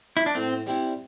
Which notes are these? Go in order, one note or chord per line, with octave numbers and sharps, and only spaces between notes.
E4
D4
A2 C4
G3 C4 E4